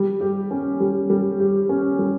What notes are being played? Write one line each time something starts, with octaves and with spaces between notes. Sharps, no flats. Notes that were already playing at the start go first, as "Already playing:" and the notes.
Already playing: G3
G4
C#4
G3
G3
G4
C#4
G3